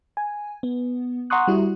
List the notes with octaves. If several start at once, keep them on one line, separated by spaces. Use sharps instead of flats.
G#5
B3
F#5 A#5 C6 C#6 D#6 F#6
G3 E4 F#4